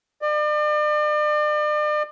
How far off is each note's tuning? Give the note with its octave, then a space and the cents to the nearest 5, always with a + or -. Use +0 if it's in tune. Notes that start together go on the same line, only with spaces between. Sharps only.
D5 +40